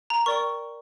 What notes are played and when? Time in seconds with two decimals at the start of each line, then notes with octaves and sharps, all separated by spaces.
0.10 A#5
0.26 A#4 D5 G5 C#6